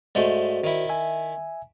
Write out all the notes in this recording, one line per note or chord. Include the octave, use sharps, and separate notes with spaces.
G#2 G#3 A3 F#4 C5 D5
D#3 E4
E5 G#5